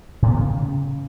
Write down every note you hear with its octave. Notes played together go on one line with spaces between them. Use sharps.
A2
B3
D#3
C#3